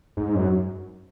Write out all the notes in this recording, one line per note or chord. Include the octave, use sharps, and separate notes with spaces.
G#2
F#2